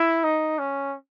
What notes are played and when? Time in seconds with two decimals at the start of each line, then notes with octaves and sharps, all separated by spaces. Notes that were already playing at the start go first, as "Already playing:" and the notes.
Already playing: E4
0.24 D#4
0.59 C#4